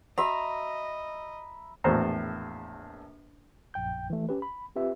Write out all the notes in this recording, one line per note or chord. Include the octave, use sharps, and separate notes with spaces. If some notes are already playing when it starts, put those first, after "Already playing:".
F#4 D#5 E5 A#5 B5
A#1 E2 A2 F#4 C5 A#5
A#1 F#2 G5 G6
E3 A3
C#4 G4 B4
B5
C4 F4 G4 B4 E5